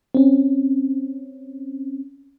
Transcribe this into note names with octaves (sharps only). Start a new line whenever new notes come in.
C4 C#4